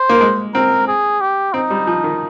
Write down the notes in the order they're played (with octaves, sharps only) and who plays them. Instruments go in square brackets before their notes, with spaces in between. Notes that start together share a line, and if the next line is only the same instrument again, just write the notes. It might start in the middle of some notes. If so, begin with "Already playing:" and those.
Already playing: [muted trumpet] C5
[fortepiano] A#3
G#3
[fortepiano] C4 [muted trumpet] A#4
[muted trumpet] G#4
G4
[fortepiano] C4 [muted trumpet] D#4
[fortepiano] G3
F3
D#3